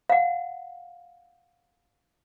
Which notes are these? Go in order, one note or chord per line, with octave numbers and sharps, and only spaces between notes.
F5 F#5